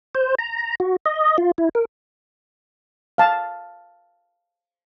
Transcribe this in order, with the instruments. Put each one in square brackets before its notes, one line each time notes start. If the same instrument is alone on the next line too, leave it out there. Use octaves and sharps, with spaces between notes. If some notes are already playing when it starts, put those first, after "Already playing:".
[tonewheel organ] C5
A#5
F#4
D#5
F4
E4
A#4
[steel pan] F5 A5